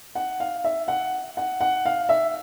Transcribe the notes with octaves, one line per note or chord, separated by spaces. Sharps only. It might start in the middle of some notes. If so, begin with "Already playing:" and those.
F#5
F5
E5
F#5
F#5
F#5
F5
E5